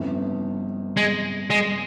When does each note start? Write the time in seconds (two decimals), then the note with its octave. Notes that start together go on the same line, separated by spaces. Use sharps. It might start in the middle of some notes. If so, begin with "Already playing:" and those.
Already playing: G1 F2 C#3 E3
0.97 G#3
1.50 G#3